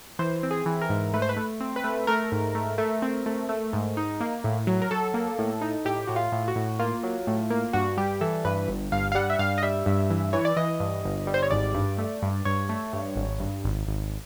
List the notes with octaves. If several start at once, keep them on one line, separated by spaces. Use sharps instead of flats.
E3 C5
C4
G#4
E3
A#4
G#2
A3 B4
C5
B4
A3
C4
B4
A3
A3 A#4
G#2
A3
A3
C4
A3
A3
G#2
D#4
A#3
A2
F#3
A#4
F#3 A4
A#3
A2
D#4
A2 G4
A2 F#4
F4
A2
F#4
A2
A#3 F4
F#3
A2
A#3
G2 F#4
G3 G4
E3 A4
G2 B4
G1
G2 F5
F5
G3 F#5
E5
G2 F5
D#5
G3 E5
G2
E3
E3 C#5
D5
E3 D#5
G2
G1
G3
C5
C#5
G#1 D5
G2
A3
G2
G2 C#5
A3
G2
G#1
G2
G#1
G#1